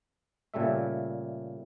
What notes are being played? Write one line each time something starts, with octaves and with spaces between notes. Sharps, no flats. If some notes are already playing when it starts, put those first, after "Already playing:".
A#2 C#3 G3 A3 E5